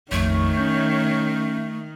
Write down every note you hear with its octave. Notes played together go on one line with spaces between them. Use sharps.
A#1 F2 D#3 A3 C#5
C#4 G6